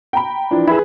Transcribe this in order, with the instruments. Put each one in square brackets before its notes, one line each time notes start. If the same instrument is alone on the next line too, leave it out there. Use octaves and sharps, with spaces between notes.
[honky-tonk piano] G5 A#5 B5
[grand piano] E3 F3 D4
[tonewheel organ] E4 [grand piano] G#4 B4